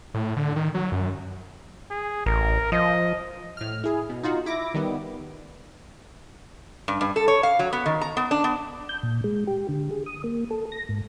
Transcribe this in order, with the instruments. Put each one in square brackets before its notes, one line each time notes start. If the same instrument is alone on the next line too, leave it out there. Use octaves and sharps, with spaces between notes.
[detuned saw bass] A2
D3
D#3
F#3
F#2
[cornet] G#4
[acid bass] A1 [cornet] A#4
[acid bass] F3 [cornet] D#5
[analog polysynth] A2 F6
E4 G#4
B2
D#4 F4 F#4
E4 D6 A#6
D#3 G3 B3
[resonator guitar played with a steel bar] G2
G2
A4
C#5
F5
F#3
B3
D#3
A#5
B3
D4
B3
[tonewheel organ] G6
A#2
G#3
G4
D3
G#4
D#6
A#3
A4
A#6
G#2